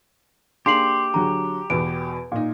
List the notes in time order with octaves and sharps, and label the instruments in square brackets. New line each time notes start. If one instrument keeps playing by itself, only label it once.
[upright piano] A#3 D4 G#4 [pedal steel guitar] G4 [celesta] C6 C7 F#7
[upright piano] D3 F#3 G#4 [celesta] A#5
[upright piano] E2 B2 B3 [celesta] D7
[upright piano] A#2 D#4